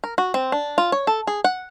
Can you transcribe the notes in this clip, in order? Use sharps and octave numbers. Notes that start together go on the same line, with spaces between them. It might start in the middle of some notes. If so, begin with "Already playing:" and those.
A#4
F#4
C4
D4
F4
C#5
A4
G#4
F#5